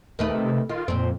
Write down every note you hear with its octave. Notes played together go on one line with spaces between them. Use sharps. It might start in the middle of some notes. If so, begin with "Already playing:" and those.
D#2 D#3 A3 B4
C3
D#3 F4
F2 A#2 C4